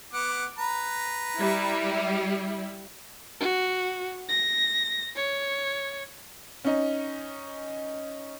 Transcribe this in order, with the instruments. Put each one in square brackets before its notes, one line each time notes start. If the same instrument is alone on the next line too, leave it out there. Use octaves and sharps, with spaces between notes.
[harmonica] B3 F#5 D6
B4 A#5
[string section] G3 E4
[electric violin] F#4
A#6
C#5
[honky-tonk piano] C#4 D#4